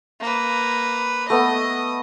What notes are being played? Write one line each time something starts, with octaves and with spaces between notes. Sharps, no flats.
A#3 B4
A3 B3 D#5